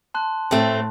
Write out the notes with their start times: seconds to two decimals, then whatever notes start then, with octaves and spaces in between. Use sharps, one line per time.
0.14 A5 C6 F#6
0.51 A2 A3 C4